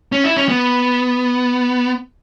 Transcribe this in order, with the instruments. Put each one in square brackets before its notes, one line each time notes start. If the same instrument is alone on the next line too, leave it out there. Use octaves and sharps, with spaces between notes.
[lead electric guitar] C#4
E4
C#4
B3